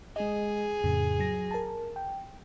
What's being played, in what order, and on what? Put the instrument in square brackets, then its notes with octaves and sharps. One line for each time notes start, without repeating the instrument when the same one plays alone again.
[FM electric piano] G#3 D#5 [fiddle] G#4
[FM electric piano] F2 A2 C#3
F#3 A#6
A#4 A5
G5